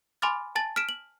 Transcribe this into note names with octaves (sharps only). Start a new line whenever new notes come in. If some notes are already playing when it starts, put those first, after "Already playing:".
G#5 B5 C6 D6 F6 A6
G#5 A5 A6 F#7
F6 B6 D7 E7
F#7